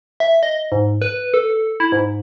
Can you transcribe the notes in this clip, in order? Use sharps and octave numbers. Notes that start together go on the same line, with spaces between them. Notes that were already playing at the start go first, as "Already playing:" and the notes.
E5
D#5
G#2
B4
A4
E4
G#2